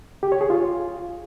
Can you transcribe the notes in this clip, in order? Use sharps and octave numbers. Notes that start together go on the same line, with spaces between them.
G4
C#5
G#4
F4